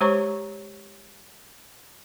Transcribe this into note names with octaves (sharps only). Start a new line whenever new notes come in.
G#3 G4 C5 C#5 A#5 C#6